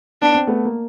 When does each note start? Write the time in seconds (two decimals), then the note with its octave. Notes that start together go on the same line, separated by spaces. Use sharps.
0.22 B3 D4
0.35 C4
0.47 A3 B3
0.65 A#3